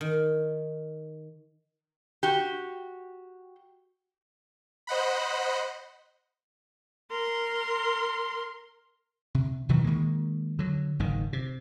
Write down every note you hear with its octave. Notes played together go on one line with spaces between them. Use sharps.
D#3
F#4 G4
C5 D#5 F#5 B5
A#4 C6
C3
B2 D#3 E3 F#3
D#3 F#3 G#3 A#3
D3 F#3
F#1 G#2 D#3
C3